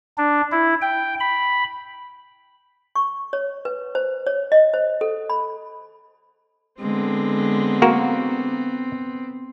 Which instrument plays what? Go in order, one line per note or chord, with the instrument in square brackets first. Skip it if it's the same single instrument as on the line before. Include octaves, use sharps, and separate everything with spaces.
[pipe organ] D4
E4
G5
B5
[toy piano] C#6
C#5
B4
C5
C#5
D#5
C5
A4
B5
[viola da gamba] D3 G#3 [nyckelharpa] B3 C4
[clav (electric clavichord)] A#3 F#4 A#4